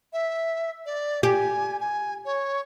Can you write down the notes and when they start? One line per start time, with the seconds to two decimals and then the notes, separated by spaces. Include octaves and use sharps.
0.13 E5
0.86 D5
1.23 G4 G#5
1.80 G#5
2.25 C#5